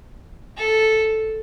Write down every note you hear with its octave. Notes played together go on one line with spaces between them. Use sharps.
A4